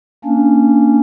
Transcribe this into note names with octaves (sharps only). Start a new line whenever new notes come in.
A#3 C#4 D4